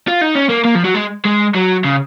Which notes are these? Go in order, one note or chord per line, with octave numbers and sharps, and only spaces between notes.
F4
D#4
C#4
A#3
A#3
F3
F#3
G#3
G#3
F#3
C#3